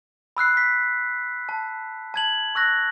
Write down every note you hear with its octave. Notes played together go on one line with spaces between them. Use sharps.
B5 E6 F#6 C7
B6
A5
A5 G#6 F#7
C#6 E6 F#6 A#6